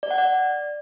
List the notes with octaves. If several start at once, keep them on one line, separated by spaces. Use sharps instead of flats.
D5
F#5
D5